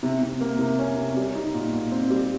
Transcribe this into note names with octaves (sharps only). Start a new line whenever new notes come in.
C3
C3
A#3
C3
C#4
C3
G3
D#4
A#2
A#2
C4
G3